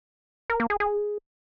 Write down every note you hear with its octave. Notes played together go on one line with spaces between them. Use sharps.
A#4
A#3
G#4
G#4